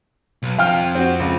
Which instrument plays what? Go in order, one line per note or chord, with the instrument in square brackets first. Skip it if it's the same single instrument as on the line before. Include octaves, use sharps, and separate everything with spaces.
[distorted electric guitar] B1
[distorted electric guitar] F2 [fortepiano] F5 G5 F6
[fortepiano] C4 F#4
C#2